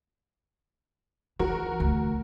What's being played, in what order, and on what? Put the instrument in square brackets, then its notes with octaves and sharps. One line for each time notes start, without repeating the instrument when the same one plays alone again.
[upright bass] E3 [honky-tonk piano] F#4 A#4
[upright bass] D2